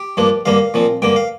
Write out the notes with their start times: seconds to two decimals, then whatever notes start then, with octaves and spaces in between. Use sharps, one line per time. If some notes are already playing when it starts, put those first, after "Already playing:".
Already playing: G4
0.17 G2 F3 A#3 D4
0.46 G2 D3 G3 A#3 F5
0.74 A#2 F3 C4
1.02 G2 D3 A#3 G5
1.16 F5